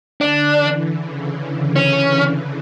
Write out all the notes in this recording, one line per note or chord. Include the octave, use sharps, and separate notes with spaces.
D3 D4
E3
C#3
C#4